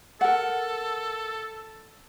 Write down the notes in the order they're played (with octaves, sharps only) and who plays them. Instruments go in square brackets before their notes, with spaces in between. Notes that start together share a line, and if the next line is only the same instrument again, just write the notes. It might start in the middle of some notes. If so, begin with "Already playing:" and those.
[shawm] A4 [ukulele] A#4 F#5